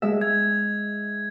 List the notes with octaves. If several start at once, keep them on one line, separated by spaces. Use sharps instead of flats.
G#3 E5
G#6